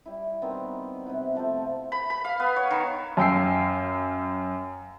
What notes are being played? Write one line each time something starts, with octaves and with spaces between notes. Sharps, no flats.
G3 E4
D#3 G3 B3 C4
C3 B3 E4 F#4
F3 A3 A4 C5
B5
B5
F5
B3
C#5
D#3
F#2 F5 G5 E6 C7